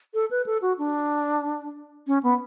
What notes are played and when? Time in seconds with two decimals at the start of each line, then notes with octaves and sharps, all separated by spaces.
0.14 A4
0.31 B4
0.46 A4
0.62 F#4
0.78 D4
2.07 C#4
2.23 B3